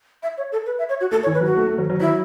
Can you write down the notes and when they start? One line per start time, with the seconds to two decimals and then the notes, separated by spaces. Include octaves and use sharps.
0.23 E5
0.37 C#5
0.52 A4
0.66 B4
0.79 E5
0.89 C#5
1.01 F#4
1.11 A3 A4
1.23 C#5
1.26 E3
1.34 B4
1.41 F#3
1.46 F#4
1.56 A3
1.67 A3
1.78 F#3
1.90 F#3
2.00 F#3 E4